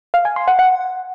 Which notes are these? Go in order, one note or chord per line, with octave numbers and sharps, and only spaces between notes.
F5
G#5
C6
F#5
F#5